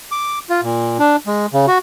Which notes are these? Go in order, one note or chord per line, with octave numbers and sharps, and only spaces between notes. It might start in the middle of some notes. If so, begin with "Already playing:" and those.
D6
F4
A#2
D4
G#3
C#3
F#4